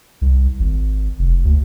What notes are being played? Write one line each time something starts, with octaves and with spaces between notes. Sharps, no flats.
C2
G#1
F1
D2